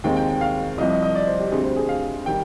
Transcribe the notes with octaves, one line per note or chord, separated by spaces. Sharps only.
D#2 D#3 G#3 C4 G5
G5
G5
F5
C2 C3 F3 D#5
D#5
D#5
D5
C5
G4
D2 D3 G3 C4 G#4
C5
G#4
F5
D#3 G3 G5